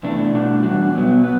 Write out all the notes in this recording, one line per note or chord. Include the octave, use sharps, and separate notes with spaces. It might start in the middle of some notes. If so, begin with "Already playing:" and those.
E2 C3 E3 A3 D4
B2 A3 D4 F#4
E2 C3 G3 D4 F#4
B2 F#3 B3
B3